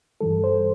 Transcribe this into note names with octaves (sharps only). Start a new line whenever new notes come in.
G2 E3 G3 A4
C5